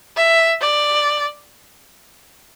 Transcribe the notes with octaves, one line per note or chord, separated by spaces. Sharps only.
E5
D5